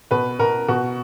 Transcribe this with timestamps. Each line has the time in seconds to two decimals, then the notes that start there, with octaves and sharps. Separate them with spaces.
0.11 B2 B4
0.39 B2 A#4
0.68 B2 F#4